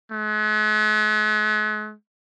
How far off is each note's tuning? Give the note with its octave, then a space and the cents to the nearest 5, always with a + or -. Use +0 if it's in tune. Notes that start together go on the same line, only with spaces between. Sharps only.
G#3 +45